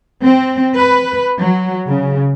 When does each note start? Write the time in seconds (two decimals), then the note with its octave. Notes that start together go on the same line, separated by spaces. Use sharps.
0.23 C4
0.76 B4
1.39 F#3
1.87 C#3